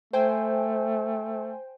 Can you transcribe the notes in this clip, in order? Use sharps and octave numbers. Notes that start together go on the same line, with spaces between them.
A3 C5 G5 G#5